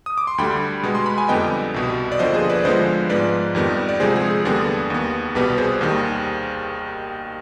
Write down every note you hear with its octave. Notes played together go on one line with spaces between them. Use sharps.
D#6
D6
C6
D2 D3 G3 G5 B5
B2 G#3 B3
C6
B5
G#5
F2 D3 G3 B3 D#5 G5
C2 B2 B3
D5
D#2 D3 F3 B3 C5 D#5
G#4 C5
B4 D5
D2 D3 F3 G#3 B3 C5 D#5
G#2 F3 G#3 B3 B4 D5
F2 D#3 G3 B3
D5
D2 C3 F3 G#3 G#4 C5
G#4
G#4
D#2 D3 G3 B3 G#4
D#2 D#3 B3
C2 B2 G3 B3 G4 B4
G#4 C5
D#2 D#3 G3